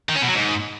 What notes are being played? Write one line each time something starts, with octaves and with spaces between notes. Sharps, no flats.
D#3
C#4
B2
F#3
G#2